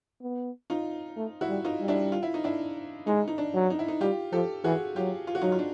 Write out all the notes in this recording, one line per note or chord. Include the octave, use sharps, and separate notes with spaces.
B3
D#4 F4
A3
E4 F#4
G3
D#4 F4
G3
D4 E4
F4
E4
D#4
D4 E4
G#3 D#4
D#4
D4
F#3
D#4
E4
D#4
G3 F4 G4
F3 G4 A4
E3 F#4 G#4
F#3 F4 G4
F4
F#4
F#3 D#4 F4
F4
D4